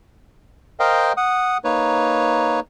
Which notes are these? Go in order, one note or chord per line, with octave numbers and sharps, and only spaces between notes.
A#4 C5 D#5 F5 G5
F#5 D#6
A#3 D#4 B4 C#5